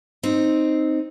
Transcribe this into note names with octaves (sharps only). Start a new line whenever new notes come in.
C4 D#4